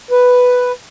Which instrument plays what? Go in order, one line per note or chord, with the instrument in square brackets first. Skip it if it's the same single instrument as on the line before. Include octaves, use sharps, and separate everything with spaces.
[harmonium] B4